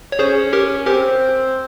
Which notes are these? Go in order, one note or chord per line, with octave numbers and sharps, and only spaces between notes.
C#5
C#4 G#4 C5
G4 A#4
C4 G4 A#4